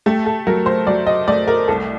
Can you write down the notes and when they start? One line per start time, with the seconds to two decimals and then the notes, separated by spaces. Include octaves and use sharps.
0.06 A3 G4
0.26 A4
0.47 F#3 A#4
0.66 C5
0.87 F#3 D5
1.07 D#5
1.28 A3 D5
1.47 A#4
1.68 C2 A4